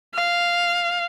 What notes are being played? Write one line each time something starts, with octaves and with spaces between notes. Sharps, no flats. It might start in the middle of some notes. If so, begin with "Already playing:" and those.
F5